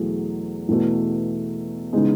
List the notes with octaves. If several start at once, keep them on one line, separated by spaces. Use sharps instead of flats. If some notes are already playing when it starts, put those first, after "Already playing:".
Already playing: E2 B2 F#3 A3 G#4
E2 B2 A3
C#3 E3 G#3 B3 D#4